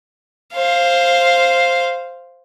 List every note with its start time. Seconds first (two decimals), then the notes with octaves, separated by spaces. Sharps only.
0.54 C5 F5